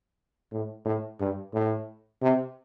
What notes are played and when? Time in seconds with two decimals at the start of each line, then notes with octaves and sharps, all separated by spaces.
0.52 A2
0.85 A2
1.20 G2
1.53 A2
2.22 C3